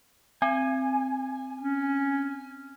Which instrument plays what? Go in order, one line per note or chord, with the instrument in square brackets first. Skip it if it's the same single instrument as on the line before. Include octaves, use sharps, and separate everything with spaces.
[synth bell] C4 [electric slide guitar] G#5
[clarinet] C#4